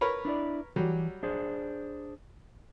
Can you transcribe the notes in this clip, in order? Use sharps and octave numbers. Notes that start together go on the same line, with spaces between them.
A#4 B4 C#5
D4 E4 D5
D#3 E3 F#3 G3
D4 G#4 C5